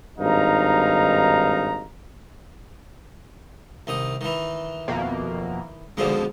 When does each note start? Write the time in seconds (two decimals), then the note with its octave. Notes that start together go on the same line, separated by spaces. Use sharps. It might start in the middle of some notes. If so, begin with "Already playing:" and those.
0.18 G#1 G2 D#4 F5 A#5
3.87 C2 D#3 D#6
4.21 D#3 E3
4.88 F2 B2 A#3
5.97 G#1 B2 D3 F3 G#3